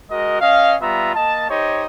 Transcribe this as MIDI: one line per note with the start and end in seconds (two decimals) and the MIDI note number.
0.11 0.40 56
0.11 0.40 66
0.11 0.40 70
0.11 0.40 75
0.41 0.75 61
0.41 0.75 75
0.41 0.75 77
0.82 1.14 55
0.82 1.14 59
0.82 1.14 65
0.82 1.14 76
0.82 1.14 82
1.15 1.49 58
1.15 1.49 75
1.15 1.49 81
1.50 1.86 63
1.50 1.86 67
1.50 1.86 72
1.50 1.86 73
1.50 1.86 75